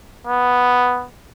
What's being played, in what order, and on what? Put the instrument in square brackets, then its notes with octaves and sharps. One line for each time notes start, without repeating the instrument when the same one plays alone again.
[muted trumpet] B3